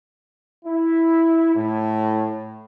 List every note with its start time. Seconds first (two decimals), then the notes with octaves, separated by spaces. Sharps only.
0.65 E4
1.55 A2